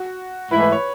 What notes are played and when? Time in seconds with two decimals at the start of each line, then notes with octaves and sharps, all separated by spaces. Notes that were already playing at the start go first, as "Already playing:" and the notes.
Already playing: F#4
0.51 G#2 E3 A3 E4 B4
0.62 B4
0.72 C#5